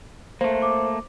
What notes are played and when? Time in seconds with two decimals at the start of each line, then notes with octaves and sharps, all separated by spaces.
0.41 A3 A#3 C5
0.62 D6